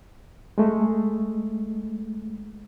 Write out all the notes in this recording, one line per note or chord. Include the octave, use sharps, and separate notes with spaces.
G#3 A3